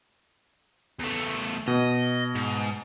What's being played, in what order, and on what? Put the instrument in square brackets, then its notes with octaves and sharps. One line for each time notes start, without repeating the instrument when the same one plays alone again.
[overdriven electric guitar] E2 A3
[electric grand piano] B2 [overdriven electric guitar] D#5
[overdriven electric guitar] G#2